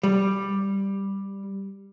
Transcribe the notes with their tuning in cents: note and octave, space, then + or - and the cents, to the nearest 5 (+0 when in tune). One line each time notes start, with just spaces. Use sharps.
G3 +5